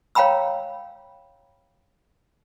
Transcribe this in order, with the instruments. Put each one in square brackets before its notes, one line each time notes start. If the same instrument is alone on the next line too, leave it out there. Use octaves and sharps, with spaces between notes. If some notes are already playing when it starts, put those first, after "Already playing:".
[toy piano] C#5 F5 G5 A#5 B5 E6